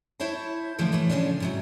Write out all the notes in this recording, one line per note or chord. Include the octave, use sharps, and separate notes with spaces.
E4 C5 C#5 E5 A5
D3 E3 F3 G3 A3 A#3
A2 E3 G3 A3
D2 C#3 F3 C#4 D4
G#2 C3 F#3